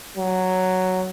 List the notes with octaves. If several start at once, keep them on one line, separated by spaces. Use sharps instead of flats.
F#3